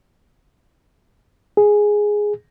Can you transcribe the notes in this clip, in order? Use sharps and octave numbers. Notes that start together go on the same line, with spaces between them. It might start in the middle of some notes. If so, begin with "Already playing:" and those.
G#4